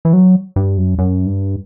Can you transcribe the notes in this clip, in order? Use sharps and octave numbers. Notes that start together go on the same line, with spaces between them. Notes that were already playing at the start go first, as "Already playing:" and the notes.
E3
F#3
G2
F#2
F#2
G2